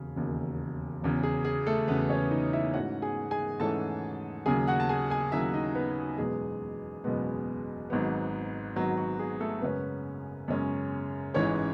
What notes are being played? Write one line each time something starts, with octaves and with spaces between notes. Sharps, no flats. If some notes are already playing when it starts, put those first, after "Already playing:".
Already playing: E1 D#2 C#3
E1 D#2 C#3
E1 E2 C#3
G#4
G#4
A3 A4
E1 E2 C#3 B3 B4
C#4 C#5
D#4 D#5
E4 E5
G#2 E3 A3 C#4 F#4 F#5
G#4 G#5
G#4 G#5
G#2 E3 A3 C#4 A4 A5
D#2 C#3 F#3 G#4 G#5
F#4 F#5
A5
G#4 G#5
G#4 G#5
D#2 C#3 F#3 E4 E5
D#4 D#5
B3 B4
F#1 E2 B2 G#3 B3 G#4
F#1 E2 B2 G#3 B3
G#1 G#2 F#3 B3
G#1 G#2 F#3 B3 F#4
F#4
G#4
A3 A4
F#2 C#3 G#3 B3 C#4 B4
F#2 C#3 G#3 C#4
A1 G#2 E3 G#3 C#4 C#5